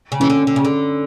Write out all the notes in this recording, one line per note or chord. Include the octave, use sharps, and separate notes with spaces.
C#3
E3 C#4
D3
D3
C#3
D3